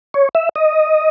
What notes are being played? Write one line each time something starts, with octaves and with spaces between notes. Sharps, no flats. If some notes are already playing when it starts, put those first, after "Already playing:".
C#5
E5
D#5